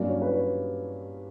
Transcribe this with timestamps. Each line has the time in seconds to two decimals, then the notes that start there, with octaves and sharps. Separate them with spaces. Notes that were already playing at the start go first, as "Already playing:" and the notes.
Already playing: G2 F#3 A#3 C#4 D5
0.09 C#5
0.22 B4
0.31 C#5